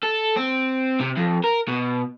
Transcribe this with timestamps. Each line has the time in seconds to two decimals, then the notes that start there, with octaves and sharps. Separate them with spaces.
0.03 A4
0.37 C4
1.01 C3
1.17 F2
1.44 A#4
1.68 B2